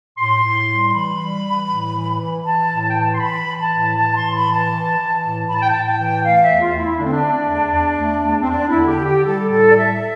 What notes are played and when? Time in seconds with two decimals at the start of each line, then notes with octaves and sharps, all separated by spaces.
0.18 A2 C6
0.43 A2
0.69 G3
0.86 C6
0.93 E3 B5
1.19 G3
1.44 E3
1.69 A2
1.94 E3
2.20 E3
2.44 E3 A5
2.70 A2
2.82 A5
2.90 G5
2.95 E3 A5
3.14 C6
3.20 E3 B5
3.46 E3
3.59 A5
3.70 A2
3.96 E3 A5
4.15 C6
4.21 A2
4.34 B5
4.47 E3
4.52 A5
4.72 E3
4.97 E3
5.22 A2
5.47 A2 B5
5.55 A5
5.62 G5
5.70 A2 A5
5.85 G5
5.98 E3
6.22 A3 F5
6.42 E5
6.48 E2
6.60 F4
6.74 A3
6.79 E4
6.98 D3 D4
7.06 C4
7.13 D4
7.23 A3
7.48 E2
7.74 E2
7.99 A3
8.25 E2
8.42 C4
8.50 E2 D4
8.68 E4
8.75 D3
8.88 G4
9.00 D3
9.06 G4
9.25 G3 A4
9.50 A2 A4
9.71 D5
9.76 G3 E5